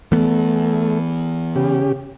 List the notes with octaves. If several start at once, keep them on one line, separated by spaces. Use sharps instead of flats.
E3 A3 B3
C#3 G4